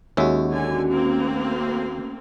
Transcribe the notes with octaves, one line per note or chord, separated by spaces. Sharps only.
D#2 G#3 C#4 F#4 E5
D3 G#5
A3 A#3 C4